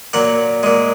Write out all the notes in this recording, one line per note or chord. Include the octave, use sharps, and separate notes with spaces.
A#2 F#3 F#5
A#2 G#3